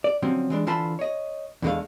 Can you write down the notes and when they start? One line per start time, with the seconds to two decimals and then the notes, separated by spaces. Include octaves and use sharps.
0.04 D5
0.22 D3 F3 F#3 C4 C#4
0.50 E3 G#3 D4
0.67 D3 E3 F4 C5 A5 B5
0.99 C#5 D#5
1.62 E2 A2 D3 G#3 A3 F5